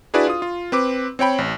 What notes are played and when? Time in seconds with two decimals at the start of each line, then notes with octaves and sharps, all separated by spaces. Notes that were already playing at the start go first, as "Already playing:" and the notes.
0.14 D4 E4 F#4 G#4 B4 D5
0.27 F4 D#6
0.42 F4
0.72 C4 B4 D6
1.19 C4 C#5 G5 B5
1.38 A1